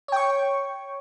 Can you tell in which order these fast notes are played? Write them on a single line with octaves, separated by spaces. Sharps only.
C#5 G5 C#6